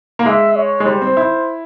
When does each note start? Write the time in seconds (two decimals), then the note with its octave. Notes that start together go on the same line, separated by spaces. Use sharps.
0.19 A#3
0.25 G#3 E5
0.56 C#5
0.80 G#3
0.86 G3 C5
1.02 C4
1.17 E4